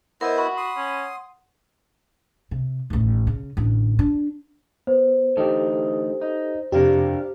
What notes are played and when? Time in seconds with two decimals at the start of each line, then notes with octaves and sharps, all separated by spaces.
0.21 B3 E4 A#4 C5 D#5
0.38 F#4 F#5 B5
0.57 C6 D#6
0.76 C#4
2.51 C3
2.90 A1 D#2
3.27 C#3
3.57 A1 D3
3.99 D4
4.87 B3 C5
5.37 D2 E3 D#4 G4 A4
6.22 D#4
6.72 F2 C3 D4 F4 G4 A#4